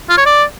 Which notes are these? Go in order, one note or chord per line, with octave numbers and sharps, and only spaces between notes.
F4
C#5
D5